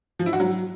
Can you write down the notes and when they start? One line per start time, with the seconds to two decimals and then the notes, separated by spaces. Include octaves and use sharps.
0.19 F3
0.26 E4
0.33 F#4
0.40 F#3